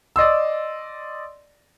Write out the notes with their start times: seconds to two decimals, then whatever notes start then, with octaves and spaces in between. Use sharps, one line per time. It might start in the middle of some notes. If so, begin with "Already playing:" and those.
0.16 D5 D#5 C6 E6